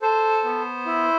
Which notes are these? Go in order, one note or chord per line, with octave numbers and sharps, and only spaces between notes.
A4 C5
B3
E4